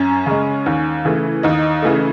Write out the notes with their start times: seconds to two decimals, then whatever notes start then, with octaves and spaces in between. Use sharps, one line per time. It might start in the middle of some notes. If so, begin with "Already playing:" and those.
Already playing: F#2 C#4
0.26 C#3 G#3
0.66 D#2
1.05 C#3 E3 A3
1.43 D#2 D#4
1.82 C#3 E3 A3